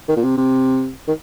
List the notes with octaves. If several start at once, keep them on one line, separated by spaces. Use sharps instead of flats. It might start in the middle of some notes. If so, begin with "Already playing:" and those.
D#3
A#2
C3
C3
D#3